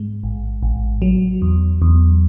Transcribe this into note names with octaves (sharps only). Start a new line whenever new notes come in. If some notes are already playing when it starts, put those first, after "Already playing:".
Already playing: G#2 G#3
A1
A1
F#3
E2
E2